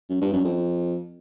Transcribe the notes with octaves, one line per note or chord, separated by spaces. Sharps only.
F#2
G2
F#2
F2